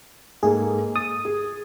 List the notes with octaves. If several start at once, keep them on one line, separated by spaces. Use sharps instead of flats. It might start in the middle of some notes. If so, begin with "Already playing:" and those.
G#2 A#3 G#4 A4
D#6 A6
G#4